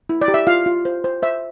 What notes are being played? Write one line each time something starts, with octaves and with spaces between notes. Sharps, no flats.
E4
D5
G4
E5
F4 F5
F4
C5
C5
C5 E5